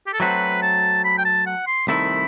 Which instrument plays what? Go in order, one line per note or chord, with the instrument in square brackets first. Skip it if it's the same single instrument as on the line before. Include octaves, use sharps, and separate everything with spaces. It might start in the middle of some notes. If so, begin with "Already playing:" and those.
[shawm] G4
A4
[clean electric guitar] F#3 A3 C4 F#4 [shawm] B4
[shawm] A5
B5
G5
A5
F#5
C6
[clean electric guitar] C2 C3 D#3 A3 E4 [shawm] B5